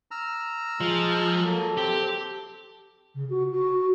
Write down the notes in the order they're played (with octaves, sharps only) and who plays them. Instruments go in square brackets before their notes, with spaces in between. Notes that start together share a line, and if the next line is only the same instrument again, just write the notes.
[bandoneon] A#5 E6 F6
[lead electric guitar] F3 [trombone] G#3
[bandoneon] F#3 A#3 [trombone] A4
[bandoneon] C4 [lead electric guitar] G4
[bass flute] C#3
F#4
F#4